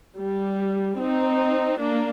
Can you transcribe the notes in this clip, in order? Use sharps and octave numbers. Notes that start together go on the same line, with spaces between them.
G3
C4 D#4
A#3 D4